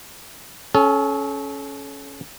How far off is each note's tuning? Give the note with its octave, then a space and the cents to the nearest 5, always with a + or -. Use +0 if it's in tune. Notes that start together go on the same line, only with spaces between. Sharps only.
C#4 +0 A4 -35